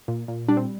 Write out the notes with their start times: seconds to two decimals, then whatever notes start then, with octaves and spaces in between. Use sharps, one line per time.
0.08 A#2
0.28 A#2
0.48 G3 D4
0.57 C4